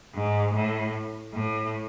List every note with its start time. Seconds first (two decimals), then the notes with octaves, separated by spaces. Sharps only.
0.14 G#2
0.54 A2
1.34 A2